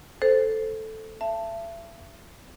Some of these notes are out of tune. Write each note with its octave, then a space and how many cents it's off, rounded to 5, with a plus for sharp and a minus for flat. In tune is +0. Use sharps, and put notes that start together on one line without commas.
A4 +0 C5 +0
E5 +35 A5 +5